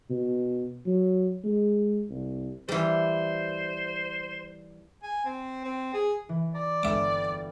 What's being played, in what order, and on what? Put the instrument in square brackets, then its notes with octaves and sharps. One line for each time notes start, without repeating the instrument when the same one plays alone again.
[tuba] B2
F#3
G#3
C2
[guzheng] E3 G3 [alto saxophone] C5
[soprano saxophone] G#5
C4
C4
G#4
[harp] E3
[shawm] D5 [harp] A#5
[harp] G1 B3 G5 [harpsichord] E5 D6